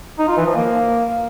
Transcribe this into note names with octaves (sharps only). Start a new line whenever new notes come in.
D#4
F4
E3
F3
A#3